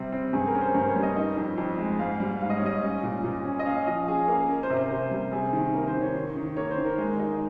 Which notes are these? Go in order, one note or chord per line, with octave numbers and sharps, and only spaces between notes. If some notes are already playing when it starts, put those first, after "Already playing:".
Already playing: C3 G3 C4
C4
G2 G#4
A#4
C#4
C5
G2 A#4
C#5
G3
D#5
D#4
F2
F2
G#3
G#2 F5
G3
G#2 F5
D#5
C#5
G3 D#5
C#4
A#2
A#2
C#4
D#5
C#4 F5
F3 D#5
C#4 G#4
A#3
C#4 A#4
C5
C3
C5
C3
G3
C3 G#4
D#3
A#3 A#4
C5
D#3
C#5
D#3
D#3
A#3 C#5
C5
D#3
A#4
G#3
D#4